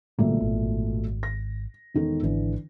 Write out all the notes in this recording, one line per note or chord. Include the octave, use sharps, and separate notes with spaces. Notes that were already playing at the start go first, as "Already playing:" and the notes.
B1 A#2 D3 G3 A3 A#3
G#1
A#6
E1 D#3 A4
G#1 D3 E3